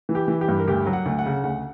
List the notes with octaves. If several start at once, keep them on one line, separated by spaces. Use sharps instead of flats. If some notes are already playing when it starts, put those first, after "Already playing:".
E3
G4
E3
G4
G2
A#4
D2 G4
F#3
F#5
D2
F#5
C#3
D2 F#5